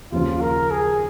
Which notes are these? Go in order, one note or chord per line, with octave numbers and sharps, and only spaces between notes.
D#2 C#3 F3 F4
A#4
G#4